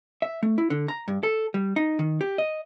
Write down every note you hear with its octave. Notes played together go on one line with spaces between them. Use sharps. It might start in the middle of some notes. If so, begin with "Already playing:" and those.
E5
A3
E4
D3
A#5
G2
A4
G3
D#4
D#3
G4
D#5